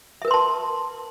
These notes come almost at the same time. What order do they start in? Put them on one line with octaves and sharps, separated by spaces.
E5 A#4 B4 C6 A5